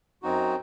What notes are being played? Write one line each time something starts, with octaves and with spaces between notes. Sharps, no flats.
F#2 F#3 C4 D#4 F#4